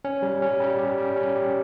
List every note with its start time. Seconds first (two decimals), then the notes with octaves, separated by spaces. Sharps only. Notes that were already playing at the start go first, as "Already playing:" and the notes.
0.05 C#4
0.22 G3
0.42 C#4
0.60 G3
0.78 G4
0.98 G3
1.16 C#4
1.35 G4